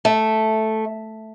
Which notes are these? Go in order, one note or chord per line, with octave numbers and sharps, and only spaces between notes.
A3